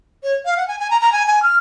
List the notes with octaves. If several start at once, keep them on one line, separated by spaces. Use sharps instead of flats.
C#5
F5
F#5
G#5
G#5
A#5
A#5
G#5
G#5
F6